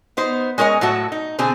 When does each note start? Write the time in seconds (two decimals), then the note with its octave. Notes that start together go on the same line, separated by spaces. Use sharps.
0.17 B3 D#4 C5
0.58 G#3 C#4 A#4 C#5 D#5
0.81 A2 F#3 F#4 A4
1.12 D#4
1.39 B2 D3 C4 G#4 G#5